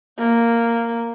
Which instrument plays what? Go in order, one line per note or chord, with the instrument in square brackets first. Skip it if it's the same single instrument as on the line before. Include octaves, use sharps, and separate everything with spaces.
[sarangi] A#3